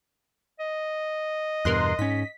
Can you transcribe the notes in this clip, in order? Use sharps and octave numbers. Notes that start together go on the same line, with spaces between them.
D#5
E2 G2 B2 A#4 C6 F#6
G#2 C#4 B6